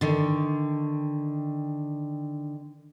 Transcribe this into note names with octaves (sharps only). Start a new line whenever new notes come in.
D3 D#3